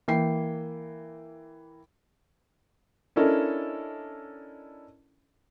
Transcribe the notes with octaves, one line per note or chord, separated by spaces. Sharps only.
E3 A#3 G5 C7
C#4 D4 E4 A4 A#4 D#5